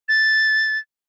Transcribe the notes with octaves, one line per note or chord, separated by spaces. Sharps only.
A6